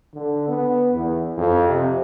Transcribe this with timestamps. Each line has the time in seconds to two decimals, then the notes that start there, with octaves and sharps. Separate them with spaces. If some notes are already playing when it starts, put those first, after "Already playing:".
0.14 D3
0.48 B3
0.94 E2
1.37 F2
1.69 C3